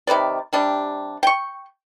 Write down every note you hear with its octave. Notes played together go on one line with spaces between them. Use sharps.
C3 D#3 B4 D5
C3 G3 D4
G5 C#6